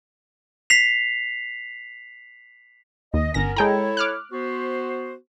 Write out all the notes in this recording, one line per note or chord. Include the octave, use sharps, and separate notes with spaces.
B6 C7 F7
D#2 D#5
G1 B3 C#4 A#4 A#6
G#3 E4 A4 C#5 G5 A#5
D6 F6 F#6
B3 F#4 C5